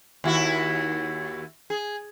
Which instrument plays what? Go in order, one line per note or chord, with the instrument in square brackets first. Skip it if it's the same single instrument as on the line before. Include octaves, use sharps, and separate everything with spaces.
[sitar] D#2 E4 F#4
G#4